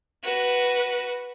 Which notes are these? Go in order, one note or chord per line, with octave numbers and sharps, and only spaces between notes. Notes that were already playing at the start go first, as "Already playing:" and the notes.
F#4 B4